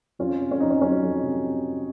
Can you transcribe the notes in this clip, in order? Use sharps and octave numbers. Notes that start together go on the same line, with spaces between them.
F2 C#4 F4
C3
C#4
F2 D#4
C#4
F#3 C#4
F2
C3